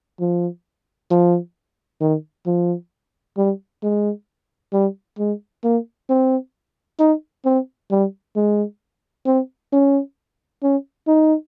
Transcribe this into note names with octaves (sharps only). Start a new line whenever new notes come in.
F3
F3
D#3
F3
G3
G#3
G3
G#3
A#3
C4
D#4
C4
G3
G#3
C4
C#4
C#4
D#4